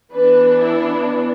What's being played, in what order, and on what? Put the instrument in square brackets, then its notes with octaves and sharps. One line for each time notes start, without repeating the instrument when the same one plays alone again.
[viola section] E3 B3 D4 B4
E4